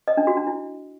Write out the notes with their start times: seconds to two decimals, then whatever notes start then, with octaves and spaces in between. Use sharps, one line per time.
0.08 D#5
0.17 D4
0.27 F#4
0.37 D4
0.47 E4